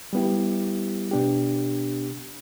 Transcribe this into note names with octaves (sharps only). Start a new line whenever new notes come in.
G3 B3 E4 G4
B2 B3 D4 G4